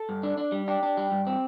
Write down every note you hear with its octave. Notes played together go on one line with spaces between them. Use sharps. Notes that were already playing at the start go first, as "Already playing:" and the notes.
Already playing: A4
G2
D4
D4
G3
D4 G4
D4
G3
G2
C4